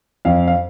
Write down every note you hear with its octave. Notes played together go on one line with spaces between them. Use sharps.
F2 F5
F5